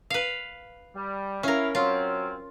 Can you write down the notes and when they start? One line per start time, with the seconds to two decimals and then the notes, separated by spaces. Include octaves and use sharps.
0.10 B4 F5
0.95 G3
1.43 C#4 E4 A#4 F5
1.75 F#3 C4 C#4 F4